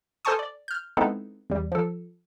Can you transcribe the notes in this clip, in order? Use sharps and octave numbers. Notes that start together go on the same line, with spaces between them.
A4 C5 G#5 A5 C#6 D#6
D5
F6 G6
G#3 B3 C4 D#4 E4 A4
E2 G3
F3 A4